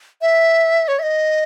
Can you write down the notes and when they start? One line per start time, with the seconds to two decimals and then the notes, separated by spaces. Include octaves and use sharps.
0.22 E5
0.88 C#5
0.99 E5
1.03 D#5